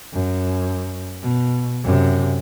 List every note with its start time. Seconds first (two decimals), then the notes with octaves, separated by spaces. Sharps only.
0.13 F#2
1.22 B2
1.84 F#2 C3